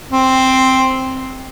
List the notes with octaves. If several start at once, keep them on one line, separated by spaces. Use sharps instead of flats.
C4